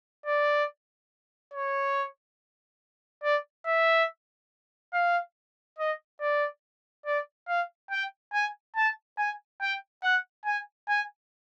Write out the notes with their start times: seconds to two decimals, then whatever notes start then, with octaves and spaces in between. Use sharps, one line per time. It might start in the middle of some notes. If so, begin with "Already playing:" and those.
0.26 D5
1.54 C#5
3.23 D5
3.66 E5
4.93 F5
5.79 D#5
6.21 D5
7.06 D5
7.48 F5
7.91 G5
8.33 G#5
8.76 A5
9.18 G#5
9.61 G5
10.03 F#5
10.45 G#5
10.89 G#5